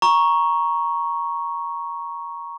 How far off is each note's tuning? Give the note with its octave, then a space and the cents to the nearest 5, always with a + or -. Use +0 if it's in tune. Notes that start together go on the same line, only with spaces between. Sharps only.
A#5 +15 C#6 +0